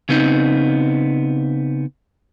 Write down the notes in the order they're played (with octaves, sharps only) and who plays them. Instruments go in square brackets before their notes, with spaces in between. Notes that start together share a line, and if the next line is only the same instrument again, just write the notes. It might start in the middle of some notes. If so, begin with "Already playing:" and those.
[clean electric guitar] C#3 B3 C4 D#4